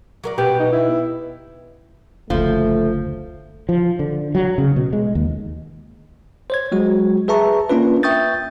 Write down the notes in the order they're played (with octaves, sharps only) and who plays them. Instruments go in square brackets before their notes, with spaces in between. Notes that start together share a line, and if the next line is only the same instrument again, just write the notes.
[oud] F#3 A#4 D5
[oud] B2 B3 B4 [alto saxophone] G4
[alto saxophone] D#4
E4
[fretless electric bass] F#1 D2 [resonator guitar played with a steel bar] F3 [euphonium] A3
[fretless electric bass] F3
D3
F#3
C#3
B2
G#3
D#2
[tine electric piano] C5 C#5 G#6
F#3 G#3 F#4
G#4 B4 E5 A5 A#5 C#6
A#3 C#4 D4 F4 B4
E5 G5 C#6 D#6 G6 A6